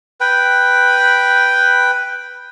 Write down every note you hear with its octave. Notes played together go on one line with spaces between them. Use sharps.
B4 G5